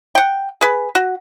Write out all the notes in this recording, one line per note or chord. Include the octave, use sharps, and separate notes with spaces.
F#5 G5
G#4 B4
F#4